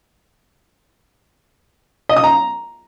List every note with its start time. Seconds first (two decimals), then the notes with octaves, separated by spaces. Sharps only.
2.09 D#5
2.17 D#6
2.24 A#5